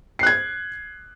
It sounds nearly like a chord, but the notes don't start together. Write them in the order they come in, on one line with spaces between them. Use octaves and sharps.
C7 F#6 G#6